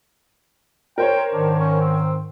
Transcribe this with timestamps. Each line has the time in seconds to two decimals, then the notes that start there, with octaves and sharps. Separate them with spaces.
0.98 A#4 C5 C#5 G5
1.33 G#2 D#3 D4
1.59 C#4
1.81 C4